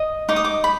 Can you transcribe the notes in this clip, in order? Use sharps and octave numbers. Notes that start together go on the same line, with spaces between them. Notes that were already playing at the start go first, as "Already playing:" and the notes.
Already playing: D#5
D#4 D6
D#6
D6
B5